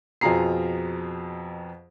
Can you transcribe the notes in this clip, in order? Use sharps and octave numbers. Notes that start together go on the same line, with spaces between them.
F2 B2 F4 G#4 A#5 C7